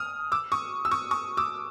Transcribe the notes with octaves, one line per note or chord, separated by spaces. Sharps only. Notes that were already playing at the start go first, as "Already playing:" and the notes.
Already playing: D#6 F6
D6 E6
C#6 D#6
E6
C#6 D#6
C#6 D#6
D6 E6